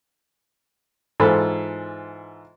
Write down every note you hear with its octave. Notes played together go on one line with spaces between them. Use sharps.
G#2 E3 F4 A4 B5